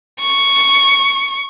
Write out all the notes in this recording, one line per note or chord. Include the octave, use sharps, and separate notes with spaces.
C#6